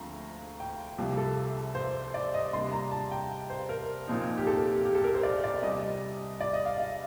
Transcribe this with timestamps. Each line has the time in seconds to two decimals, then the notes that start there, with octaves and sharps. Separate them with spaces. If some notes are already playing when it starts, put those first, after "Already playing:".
Already playing: D2 F3 A3 C4 F5 A#5
0.60 G5
0.98 C2 C3 F3
1.17 A4
1.75 C5
2.14 D5
2.34 D#5
2.53 C3 G3 A#3 D4 C6
2.72 A#5
2.91 A5
3.11 G5
3.50 C5
3.69 A#4
4.08 A#2 F3 C4 D#4
4.37 G4
4.47 A4
4.66 G4
4.85 G4
4.95 A4
5.04 A#4
5.15 C5
5.23 D5
5.44 D5
5.62 C2 C3 G3 D#5
6.41 D5
6.53 D#5
6.66 F5
6.78 F5